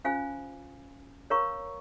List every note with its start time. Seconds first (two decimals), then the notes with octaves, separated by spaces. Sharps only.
0.04 C#4 F4 C5 F5 G#5
1.30 A#4 C#5 F5 A#5 C#6